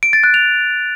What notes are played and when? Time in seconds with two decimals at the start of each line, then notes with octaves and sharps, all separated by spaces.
0.03 D7
0.13 A6
0.24 F#6
0.34 F7